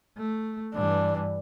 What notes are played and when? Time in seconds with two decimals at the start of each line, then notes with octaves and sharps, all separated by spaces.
0.17 A3
0.75 G2 E3 D4